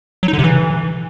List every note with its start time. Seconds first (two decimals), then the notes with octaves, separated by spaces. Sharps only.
0.23 F#3
0.28 D#4
0.33 D3
0.39 C3
0.44 E3